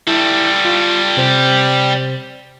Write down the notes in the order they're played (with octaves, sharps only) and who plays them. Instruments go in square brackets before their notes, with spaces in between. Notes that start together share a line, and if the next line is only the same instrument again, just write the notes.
[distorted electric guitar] G3 A4 [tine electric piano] E4
[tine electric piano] F4
C3 C5